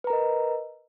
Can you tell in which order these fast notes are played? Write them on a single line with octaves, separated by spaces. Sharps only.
B4 A#5 A#4 D#5